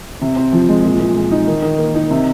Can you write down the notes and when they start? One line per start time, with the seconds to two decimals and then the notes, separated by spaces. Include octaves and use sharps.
0.21 C3
0.36 C4
0.53 F3
0.69 G#3
0.84 A#2
0.99 A#2
1.16 G#3
1.31 D#4
1.47 D#3
1.62 D#3
1.78 A#3
1.95 D#4
2.11 C3